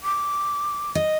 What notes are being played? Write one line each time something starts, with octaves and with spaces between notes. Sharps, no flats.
D6
D#5